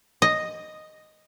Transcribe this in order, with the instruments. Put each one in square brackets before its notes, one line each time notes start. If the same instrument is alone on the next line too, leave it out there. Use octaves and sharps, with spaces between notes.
[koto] D#5